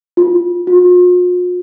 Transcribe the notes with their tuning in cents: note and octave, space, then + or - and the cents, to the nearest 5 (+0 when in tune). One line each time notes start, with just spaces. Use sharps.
F4 +5
F4 +45